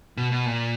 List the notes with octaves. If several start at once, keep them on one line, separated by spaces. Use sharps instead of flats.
B2
B2
A#2